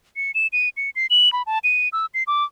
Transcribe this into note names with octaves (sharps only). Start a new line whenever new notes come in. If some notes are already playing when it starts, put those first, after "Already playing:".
C#7
E7
D#7
C#7
C7
F#7
B5
A5
D#7
E6
C7
D6